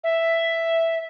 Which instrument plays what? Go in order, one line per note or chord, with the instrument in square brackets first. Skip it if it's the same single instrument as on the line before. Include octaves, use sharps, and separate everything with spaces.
[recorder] E5